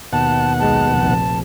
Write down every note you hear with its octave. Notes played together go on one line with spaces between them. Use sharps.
D#2 B2 F#5 A5
B1 G#3 A5
F1 A#1